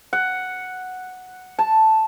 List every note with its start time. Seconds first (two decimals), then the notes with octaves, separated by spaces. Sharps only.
0.13 F#5
1.59 A5